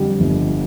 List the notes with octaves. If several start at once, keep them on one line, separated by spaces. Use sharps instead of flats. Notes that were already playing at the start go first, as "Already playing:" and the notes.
Already playing: F2 D3 G3
G1